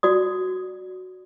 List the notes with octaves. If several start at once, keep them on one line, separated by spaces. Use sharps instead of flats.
F#4 D5 D#6